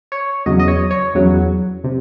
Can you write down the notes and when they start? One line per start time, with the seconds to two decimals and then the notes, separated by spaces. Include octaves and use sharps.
0.12 C#5
0.46 E2 C#3 F#3 D#5
0.59 D#5
0.68 C#5
0.91 C#5
1.14 E2 C#3 F#3
1.84 C3